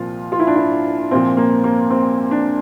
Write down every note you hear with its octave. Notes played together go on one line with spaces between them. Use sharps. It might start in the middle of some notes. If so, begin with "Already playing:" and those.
Already playing: C2 A#2 F3 F4
F4
E4
D4
E4
C2 A#2 F3 C4
A#3
A#3
C4
D4